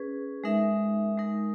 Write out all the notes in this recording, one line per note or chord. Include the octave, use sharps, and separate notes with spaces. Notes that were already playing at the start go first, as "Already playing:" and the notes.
Already playing: C#4 G#4 B4
G#3 D#4 A#4 E5
G#3 D#4 A#4